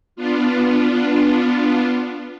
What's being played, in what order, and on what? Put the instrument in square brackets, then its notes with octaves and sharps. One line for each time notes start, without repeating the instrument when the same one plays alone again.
[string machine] B3 D4 F4